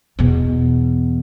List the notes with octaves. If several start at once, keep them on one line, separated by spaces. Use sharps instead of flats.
E2 B2